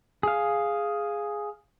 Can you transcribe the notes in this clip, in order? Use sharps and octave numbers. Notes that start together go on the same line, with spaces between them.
G#4 F5